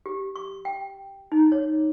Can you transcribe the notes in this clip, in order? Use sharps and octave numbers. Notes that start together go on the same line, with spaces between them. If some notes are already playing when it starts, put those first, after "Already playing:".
G4
C#6
G5
D#4
C#5